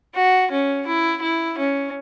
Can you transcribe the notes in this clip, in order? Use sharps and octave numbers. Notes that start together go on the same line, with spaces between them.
F#4
C#4
E4
E4
C#4